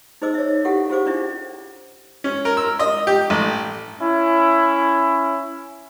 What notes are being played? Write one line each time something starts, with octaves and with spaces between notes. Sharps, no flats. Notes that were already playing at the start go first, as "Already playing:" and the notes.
D#4 G#4 C5 D#5 D6 E6
C#5 E5
E4 G4 A4 F5 F#5
F4 G4 G#4 C5 F5 D6
C#4 D4 E4 E5
C#4
A#4
E6
D#5
G4
A1
C#4 E4